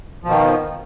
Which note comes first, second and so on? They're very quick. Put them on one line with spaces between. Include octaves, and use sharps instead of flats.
F3 B2 D#3